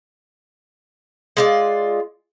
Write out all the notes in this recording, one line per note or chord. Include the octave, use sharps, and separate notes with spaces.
G#3 F4 D5